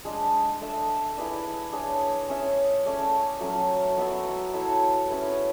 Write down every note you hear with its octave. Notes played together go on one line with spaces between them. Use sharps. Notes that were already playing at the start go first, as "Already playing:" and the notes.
G#3 D4 G#4
A3 D4 A4 E5
E4 G#4 B4 D5
D4 G#4 C#5
C#4 G#4 C#5 E5
A3 C#4 G#4 D5
F#3 A3 C#4
B3 F#4 B4 E5
E4 A4 C#5 E5
C#4 E4 G#4 B4